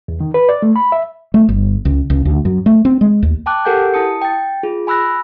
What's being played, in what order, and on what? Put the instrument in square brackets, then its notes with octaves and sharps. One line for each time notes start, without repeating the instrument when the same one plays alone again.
[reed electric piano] E2
D#3
B4
D5
A3
B5
E5
[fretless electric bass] A3
G1
C#2
C#2
D2
F#2
A3
C4
G#3
D#2
[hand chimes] G5 A5 D6 F#6
G4 A4 A#4 F#5 G#5 G6
E4 A5 D#6 C#7
G5 A6
F4 G#4
G#5 B5 E6 F#6 A#6